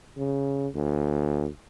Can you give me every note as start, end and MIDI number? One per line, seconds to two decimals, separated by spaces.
0.17 0.67 49
0.75 1.46 38